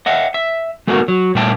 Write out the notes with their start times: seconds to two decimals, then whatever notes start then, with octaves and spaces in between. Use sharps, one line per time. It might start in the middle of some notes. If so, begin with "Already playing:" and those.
0.06 D#5 E5 F#5
0.34 E5
0.87 G#3 A3 B3 F#4 A4 A#4
1.08 F#3
1.35 A#2 G3 A3 E5 G5 A5